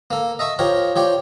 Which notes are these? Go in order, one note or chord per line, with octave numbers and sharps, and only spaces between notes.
A#3 A4
D#5 E5 A5 C#6
F3 G4 A#4 C#5
F3 G4 C#5 D5